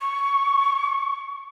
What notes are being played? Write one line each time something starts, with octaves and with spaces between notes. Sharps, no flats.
C#6